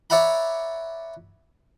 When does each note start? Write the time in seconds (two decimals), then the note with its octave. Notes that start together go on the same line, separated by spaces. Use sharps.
0.10 C#5 D5 E5 F#5 A#5 B5